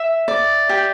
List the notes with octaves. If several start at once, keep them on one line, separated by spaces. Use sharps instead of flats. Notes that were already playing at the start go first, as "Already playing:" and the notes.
Already playing: E5
D5
G4